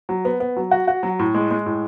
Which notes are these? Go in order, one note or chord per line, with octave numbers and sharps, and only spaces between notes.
F#3
B3
B3
F#3
F#4
F#4
F#3
A2
G#3
G#3
A2